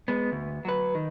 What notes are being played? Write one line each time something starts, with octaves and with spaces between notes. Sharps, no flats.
G#3 B3
D2
F#3 B4
D#3